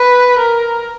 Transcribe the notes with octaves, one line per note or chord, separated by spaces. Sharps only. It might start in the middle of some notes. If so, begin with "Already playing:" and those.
Already playing: B4
A#4